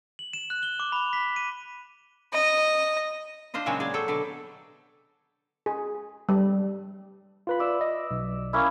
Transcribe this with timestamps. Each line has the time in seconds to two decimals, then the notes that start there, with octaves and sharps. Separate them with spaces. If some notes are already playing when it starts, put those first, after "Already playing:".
0.19 F#7
0.33 E7
0.50 F#6
0.63 G7
0.80 D6
0.92 B5
1.13 B6
1.36 D#7
2.33 D#5
3.54 D4 F4 C5 D#5
3.66 A#2 C#3 F#3 G#3 C4
3.80 G#4 D5
3.94 F#3 A4 G5
4.08 B2 D3 D5
5.66 G#4
6.29 G3
7.47 F4 B4 B5
7.59 D5 E5
7.81 D#5
8.11 B1
8.53 A#3 C#4 E4